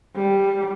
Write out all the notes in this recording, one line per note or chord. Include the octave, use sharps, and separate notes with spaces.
G3